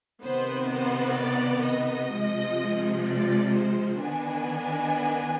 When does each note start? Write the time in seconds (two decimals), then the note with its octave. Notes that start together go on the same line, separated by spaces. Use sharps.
0.23 C3 D#3 B3 C5
0.71 C5
1.18 D5
1.65 D#5
2.12 C3 F3 G#3
3.06 D5
3.53 C5
4.00 D#3 B3 D4 G#5